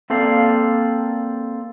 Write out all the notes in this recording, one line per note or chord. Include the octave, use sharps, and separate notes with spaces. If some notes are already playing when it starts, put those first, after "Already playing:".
A#3 C4 A4 D5 F5